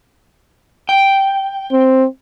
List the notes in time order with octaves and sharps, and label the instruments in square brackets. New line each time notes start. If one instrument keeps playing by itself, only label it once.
[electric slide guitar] G5
[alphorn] C4